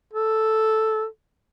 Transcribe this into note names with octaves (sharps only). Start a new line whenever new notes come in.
A4